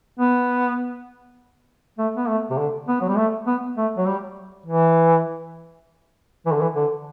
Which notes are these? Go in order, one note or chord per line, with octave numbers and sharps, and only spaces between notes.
B3
A3
B3
A3
C3
D3
B3
F#3
G3
A3
B3
A3
F#3
G3
E3
E3
D3
E3
D3